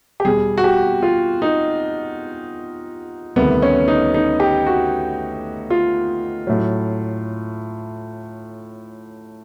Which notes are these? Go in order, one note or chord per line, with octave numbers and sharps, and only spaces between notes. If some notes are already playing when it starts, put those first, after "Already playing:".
G4
E2 B2 G3 G#4
F#4
G4
F4
D#4
D2 C3 D#3 G3 B3
C#4
D#4
D#4
G4
F#4
F4
A2 F#3